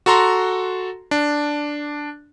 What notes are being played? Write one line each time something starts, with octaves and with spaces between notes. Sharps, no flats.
F#4 A4 A#5 C6
D4